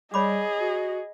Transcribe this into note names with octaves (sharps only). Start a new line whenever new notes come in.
G3 G#4 C#5 D#5 B5 D6
F#4